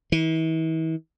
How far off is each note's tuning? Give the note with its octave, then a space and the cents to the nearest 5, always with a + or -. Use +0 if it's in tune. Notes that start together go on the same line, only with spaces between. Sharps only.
E3 -40